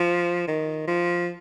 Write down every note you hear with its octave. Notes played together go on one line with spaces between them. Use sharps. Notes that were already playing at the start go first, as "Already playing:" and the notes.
Already playing: F3
D#3
F3